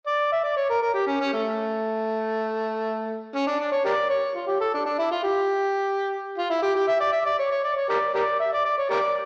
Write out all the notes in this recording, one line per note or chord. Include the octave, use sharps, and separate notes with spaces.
D5
E5
D5
C#5
A#4
A#4
G4
C#4
C#4
A3
C#4
D4
D4
C#5
G4 A#4 D5
C#5
F4
G4
A4
D4
D4
E4
F4
G4
F4
E4
G4
G4
E5
D5
E5
D5
C#5
C#5
D5
C#5
G4 A#4 D5
G4 A#4 D5
E5
D5
D5
C#5
G4 A#4 D5